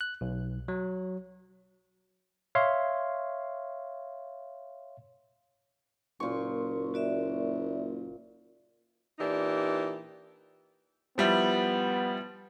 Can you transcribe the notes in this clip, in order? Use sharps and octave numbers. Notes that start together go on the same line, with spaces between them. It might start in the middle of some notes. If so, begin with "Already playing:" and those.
F#6
B1
F#3
C#5 E5 F5 C6
F#1 A#2 C6 C#6
F#4 D5 E5
A#2 E3 D4 D#4 G4
F3 G3 B3 E4